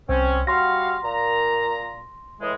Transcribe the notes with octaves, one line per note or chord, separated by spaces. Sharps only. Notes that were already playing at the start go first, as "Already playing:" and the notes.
C2 C4 C#4
G3 F#4 F5 C6 A#6
A#2 A#5
A2 E3 G#3